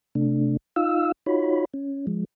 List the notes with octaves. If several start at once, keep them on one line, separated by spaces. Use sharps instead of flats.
C3 A3 D4
D#4 F4 F5 E6
D#4 F4 F#4 C#5 B5
C#4
F3 G#3